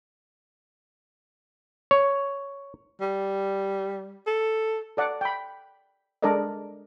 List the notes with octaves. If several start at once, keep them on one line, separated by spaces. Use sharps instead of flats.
C#5
G3
A4
A4 D5 F#5
G5 B5
G#3 D4 A4 A#4 D5 D#5